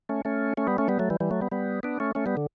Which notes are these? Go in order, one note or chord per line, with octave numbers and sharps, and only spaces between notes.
A3 C#4
A3 C#4
A3 C#4
G3 B3
A3 C#4
G3 B3
F#3 A3
E3 G3
E3 G3
F#3 A3
G3 B3
G3 B3
B3 D4
A3 C#4
A3 C#4
G3 B3
D3